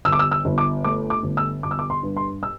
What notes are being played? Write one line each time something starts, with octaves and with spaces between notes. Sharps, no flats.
G1 E6
D6
E6
E6
G1
D6
A3 D6
D6
G1
E6
G1 D6
E6
D6
C6
G2
C6
E6